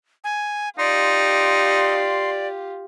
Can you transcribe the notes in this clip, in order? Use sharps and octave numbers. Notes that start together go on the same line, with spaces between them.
G#5
D#4 F4 G4 D5 C6